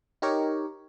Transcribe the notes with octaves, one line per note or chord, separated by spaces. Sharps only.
D#4 G4 A#4 C#5